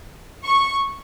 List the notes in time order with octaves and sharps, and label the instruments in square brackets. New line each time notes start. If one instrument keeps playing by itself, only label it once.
[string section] C#6